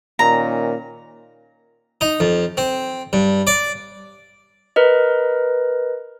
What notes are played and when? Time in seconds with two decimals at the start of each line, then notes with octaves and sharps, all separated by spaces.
0.19 A#2 D#3 C#4 A#5
2.01 D#4
2.20 F2
2.57 C4
3.13 G2
3.47 D5
4.76 A#4 B4 D#5